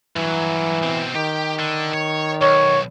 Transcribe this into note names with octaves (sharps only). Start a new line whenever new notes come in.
G2 E3 F#3
B2 C4
D#3 G4
D3
C#5
B1 C#5